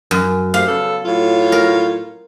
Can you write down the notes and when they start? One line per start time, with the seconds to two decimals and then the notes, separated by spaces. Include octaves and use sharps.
0.11 F#2
0.54 A3 G4 C5 F5
0.68 C#3 B3 A4
1.04 A2 F#3 F4
1.52 A#4